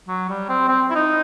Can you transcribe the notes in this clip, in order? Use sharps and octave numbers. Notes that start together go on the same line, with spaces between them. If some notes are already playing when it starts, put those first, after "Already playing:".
F#3
G3
C4
C4
E4
D#4